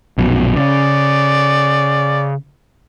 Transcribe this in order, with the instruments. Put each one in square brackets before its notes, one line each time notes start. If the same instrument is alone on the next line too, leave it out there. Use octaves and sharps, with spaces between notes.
[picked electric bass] A#1 F#2 B2
[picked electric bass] C#3 [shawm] D5